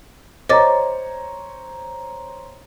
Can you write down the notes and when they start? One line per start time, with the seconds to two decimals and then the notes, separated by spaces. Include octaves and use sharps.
0.49 C5 C#5 D#5 A#5 D6 A6